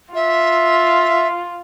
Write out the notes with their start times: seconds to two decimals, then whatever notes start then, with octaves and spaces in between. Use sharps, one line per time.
0.14 F4 E5